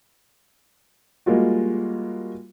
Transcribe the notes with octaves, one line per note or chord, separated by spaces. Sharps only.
G3 G#3 A#3 F4 F#4